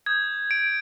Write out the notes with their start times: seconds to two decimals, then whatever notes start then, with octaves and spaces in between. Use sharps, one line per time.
0.06 D#6 G6 G#6
0.51 D7